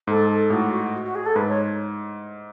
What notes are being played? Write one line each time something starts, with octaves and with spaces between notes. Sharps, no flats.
G#2 A4
A4
A2 F#4
F#4
F#4
G#4
A4
G#2 B4
C#5